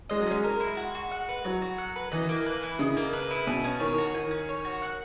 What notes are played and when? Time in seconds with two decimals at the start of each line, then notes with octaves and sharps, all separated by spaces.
0.09 G#3 D#5
0.20 F#3
0.26 G#3 C#4
0.44 A#4
0.60 E4
0.77 F#4
0.95 F#4
1.11 F#5
1.29 B4
1.44 F#3 F#4
1.62 F#4
1.78 F#5
1.96 B4
2.12 E3 D#5
2.29 A#3
2.46 B4
2.63 E4
2.79 C#3 D#5
2.97 A#3
3.13 B4
3.31 E4
3.47 B2 G#5
3.64 C#4
3.80 D#3 C#5
3.98 F#4
4.14 D#3 G#5
4.31 C#4
4.49 C#5
4.65 F#4
4.82 F#5